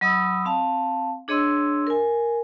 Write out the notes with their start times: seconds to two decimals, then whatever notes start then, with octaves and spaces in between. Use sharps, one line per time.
0.01 F#3 D#5 B5 D#6 E6
0.45 C4 F5 A5
1.28 D4 G#4 C#5 D#5 C6 E6
1.87 A#4 G#5